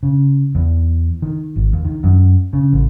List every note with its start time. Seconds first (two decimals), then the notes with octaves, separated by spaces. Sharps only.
0.03 C#3
0.55 E2
1.22 D#3
1.56 G#1
1.73 D#2
1.85 D#3
2.04 F#2
2.53 C#3
2.73 A1